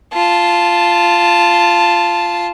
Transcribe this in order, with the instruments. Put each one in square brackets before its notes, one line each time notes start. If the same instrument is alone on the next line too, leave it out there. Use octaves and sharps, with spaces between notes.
[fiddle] F4 A5